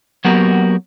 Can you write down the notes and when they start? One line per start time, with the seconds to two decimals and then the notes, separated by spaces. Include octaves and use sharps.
0.25 F#3 A#3 B3 F#4 G4 A#4